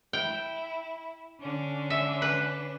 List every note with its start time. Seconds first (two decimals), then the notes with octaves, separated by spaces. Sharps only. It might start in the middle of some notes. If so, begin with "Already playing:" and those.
0.13 E4 G5
1.39 D3 C#4 D4
1.90 E5
2.22 B4